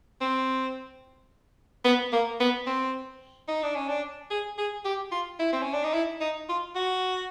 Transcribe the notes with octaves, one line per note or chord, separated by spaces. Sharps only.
C4
B3
A#3
B3
C4
D#4
D4
C#4
D4
G#4
G#4
G4
F4
E4
C4
C#4
D4
D#4
E4
D#4
F4
F#4